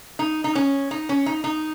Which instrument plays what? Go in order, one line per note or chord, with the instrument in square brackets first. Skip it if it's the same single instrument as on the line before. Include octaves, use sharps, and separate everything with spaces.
[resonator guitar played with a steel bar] D#4
D#4
C#4
D#4
C#4
D#4
D#4